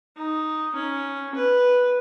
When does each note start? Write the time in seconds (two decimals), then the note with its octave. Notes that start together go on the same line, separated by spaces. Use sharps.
0.17 D#4
0.75 C#4
1.34 B4